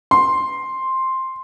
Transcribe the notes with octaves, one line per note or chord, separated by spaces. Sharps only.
C6